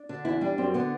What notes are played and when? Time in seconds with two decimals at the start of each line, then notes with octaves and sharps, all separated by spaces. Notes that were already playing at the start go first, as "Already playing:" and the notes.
Already playing: D4
0.09 D3
0.25 E2 E4
0.41 G3 D4
0.58 F#2 C4
0.74 D3 B3